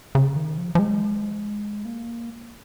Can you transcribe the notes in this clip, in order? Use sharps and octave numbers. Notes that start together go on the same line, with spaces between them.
C#3
D#3
F3
F3
G#3
A#3